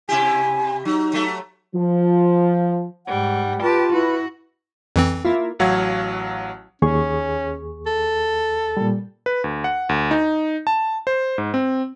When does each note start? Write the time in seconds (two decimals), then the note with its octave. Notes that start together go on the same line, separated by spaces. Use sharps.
0.09 C3 E4 G4 G#5
0.85 F#3 D#4
1.13 F#3 A3
1.75 F3
3.06 G#2 G3 F#5
3.62 F4 G4 B4 A5
3.92 E4 F#4 B4
4.96 F2 E3 C4
5.25 A#3 E4 F4
5.59 A1 F#3 F5 F#5 C#6 G#6
6.82 D#2 C#4 G#4 C#6
7.87 A4
8.77 A#2 G3
9.26 B4
9.44 D2
9.64 F#5
9.89 D2
10.11 D#4
10.67 A5
11.07 C5
11.38 G#2
11.54 C4